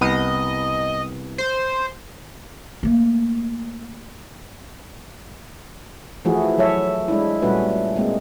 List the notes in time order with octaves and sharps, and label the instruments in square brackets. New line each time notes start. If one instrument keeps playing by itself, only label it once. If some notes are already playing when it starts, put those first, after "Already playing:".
[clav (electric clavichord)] C2 B3 [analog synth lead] D#5
[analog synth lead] C5
[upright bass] A3 A#3
[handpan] E3 F3 A3 E4 F#4 G#4
F#3 A4 C#5 E5
G#3 D4 E4
A#2 G3 A3 C#4 F#4 B4
G#3 A#3 C4